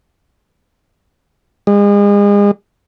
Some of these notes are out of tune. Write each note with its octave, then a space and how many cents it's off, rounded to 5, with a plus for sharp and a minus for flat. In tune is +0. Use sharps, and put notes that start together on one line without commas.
G#3 -35